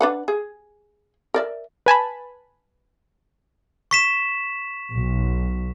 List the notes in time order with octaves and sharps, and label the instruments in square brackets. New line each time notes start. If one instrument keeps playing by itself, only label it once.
[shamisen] D4 B4 F#5
G#4
A#4 D5 E5
[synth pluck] B4 G#5 A5 B5
[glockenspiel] C#6 B6 E7
[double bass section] B1